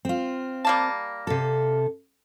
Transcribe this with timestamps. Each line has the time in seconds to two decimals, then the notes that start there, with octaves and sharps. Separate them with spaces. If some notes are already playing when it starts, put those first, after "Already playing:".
0.05 C4 F4
0.65 G3 A#3 A5
1.27 C3 A4